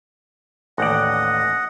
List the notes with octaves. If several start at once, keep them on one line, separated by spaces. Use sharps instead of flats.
A1 D#2 D5 D#5 F#5